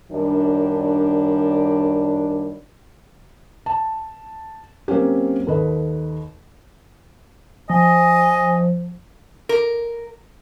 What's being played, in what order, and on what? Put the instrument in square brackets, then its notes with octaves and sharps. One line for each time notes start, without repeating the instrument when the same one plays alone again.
[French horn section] F#2 D#3 G3 D4
[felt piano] A5
F#3 A#3 C4 C#4 G4
D#2 A4 B4 D#5
[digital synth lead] F3 [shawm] D#5 [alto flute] G#5
[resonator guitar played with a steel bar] A#4